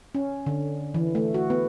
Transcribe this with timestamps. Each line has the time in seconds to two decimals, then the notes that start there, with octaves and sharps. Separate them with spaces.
0.15 C#4
0.46 D3
0.94 E3
1.15 A3
1.34 F#4
1.50 B3